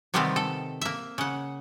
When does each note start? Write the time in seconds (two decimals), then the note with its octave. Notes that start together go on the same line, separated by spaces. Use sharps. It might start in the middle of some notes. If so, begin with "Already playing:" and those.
0.14 C3 D#3 G3 G#3 B3 C4
0.36 A4
0.81 A#3 E5
1.18 C#3 F#5